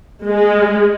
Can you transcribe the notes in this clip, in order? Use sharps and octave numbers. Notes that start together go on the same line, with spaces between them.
G#3